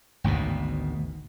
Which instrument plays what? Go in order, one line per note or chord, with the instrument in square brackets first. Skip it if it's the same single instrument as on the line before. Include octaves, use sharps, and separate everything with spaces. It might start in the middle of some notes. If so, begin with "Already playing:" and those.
[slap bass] G#1 D2 G#2 B2